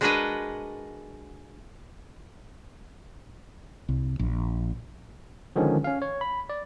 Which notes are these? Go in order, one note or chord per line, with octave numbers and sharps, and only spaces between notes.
G#3 D4 F#4 A#4 B4 D#5
C2
A#1
D3 D#3 F3 G#3 C#4
C#4 F5
C#5
B5
D5